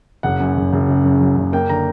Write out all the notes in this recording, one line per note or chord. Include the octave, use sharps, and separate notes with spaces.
F#1 F#5
F#2
F#1
F#1
C#3
F#2
F#3
F#1
A#3 G5
D3 A#5